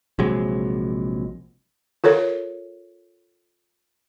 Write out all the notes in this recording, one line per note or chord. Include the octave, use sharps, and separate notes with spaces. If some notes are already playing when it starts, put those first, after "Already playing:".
A#1 C3 F#3 G#3
F4 A4 A#4 C#5